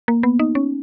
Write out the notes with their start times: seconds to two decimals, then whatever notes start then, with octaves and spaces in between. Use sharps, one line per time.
0.08 A#3
0.23 B3
0.39 D#4
0.55 C#4